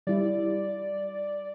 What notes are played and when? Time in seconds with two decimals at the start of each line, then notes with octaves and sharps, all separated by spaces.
0.07 G3 E4 D5